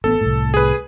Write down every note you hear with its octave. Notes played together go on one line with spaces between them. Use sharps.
A1 A#3 B3 A4
C2 A2
G#4 B4